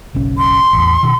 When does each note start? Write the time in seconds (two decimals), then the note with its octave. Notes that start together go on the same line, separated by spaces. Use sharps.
0.15 F#1 B1 C#4
0.38 C6
0.73 A1 E2
1.03 B2 D#3